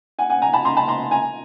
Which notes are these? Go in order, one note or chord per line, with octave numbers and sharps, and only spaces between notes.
F#5 G#5
F#5 G#5
G#5 A#5
A5 B5
A#5 C6
A5 B5
A#5 C6
G#5 A#5